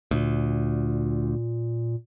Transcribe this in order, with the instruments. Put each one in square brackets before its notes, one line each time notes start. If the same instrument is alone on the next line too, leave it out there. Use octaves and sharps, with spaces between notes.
[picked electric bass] D2 [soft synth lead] A#2